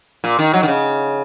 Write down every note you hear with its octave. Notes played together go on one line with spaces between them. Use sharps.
A#2
D#3
F#3
D#3
C#3